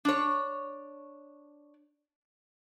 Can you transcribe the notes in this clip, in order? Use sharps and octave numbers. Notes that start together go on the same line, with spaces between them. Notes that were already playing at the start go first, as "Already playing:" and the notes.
D4 C#5